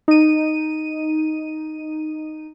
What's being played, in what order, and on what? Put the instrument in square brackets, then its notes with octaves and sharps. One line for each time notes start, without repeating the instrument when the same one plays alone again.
[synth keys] D#4 D#7